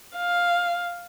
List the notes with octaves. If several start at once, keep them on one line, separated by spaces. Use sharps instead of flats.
F5